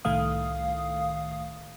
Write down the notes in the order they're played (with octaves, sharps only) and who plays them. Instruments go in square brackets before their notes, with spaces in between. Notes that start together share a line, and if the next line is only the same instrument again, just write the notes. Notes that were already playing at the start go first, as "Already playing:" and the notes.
[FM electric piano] C2 A2 D#3 A3 F5 D#6